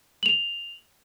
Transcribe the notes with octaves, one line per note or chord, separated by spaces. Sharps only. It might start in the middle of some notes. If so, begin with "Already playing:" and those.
F7 F#7